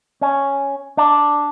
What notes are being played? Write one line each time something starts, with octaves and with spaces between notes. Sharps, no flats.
C#4
D4